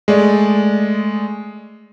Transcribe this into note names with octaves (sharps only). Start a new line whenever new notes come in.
G#3 A3 D5